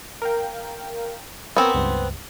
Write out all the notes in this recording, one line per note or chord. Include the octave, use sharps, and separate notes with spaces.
A#4 F5 G5
B3 C4 A#4 C#5 G#5
C#2 G2